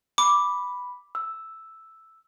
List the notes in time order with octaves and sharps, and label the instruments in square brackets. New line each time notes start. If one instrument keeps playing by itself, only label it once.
[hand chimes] B5 [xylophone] D6
[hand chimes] E6